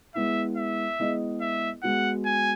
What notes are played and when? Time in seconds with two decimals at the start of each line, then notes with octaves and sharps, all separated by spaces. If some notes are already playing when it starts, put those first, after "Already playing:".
0.15 G#3 B3 E4 E5
0.57 E5
0.99 G#3 B3 E4 G#4 D#5
1.41 E5
1.83 G#3 B3 F#4 F#5
2.26 G#5